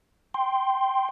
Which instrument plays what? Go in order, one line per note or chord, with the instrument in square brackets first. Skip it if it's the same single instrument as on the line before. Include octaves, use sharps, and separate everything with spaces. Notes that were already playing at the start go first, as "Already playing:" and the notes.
[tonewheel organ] G5 C6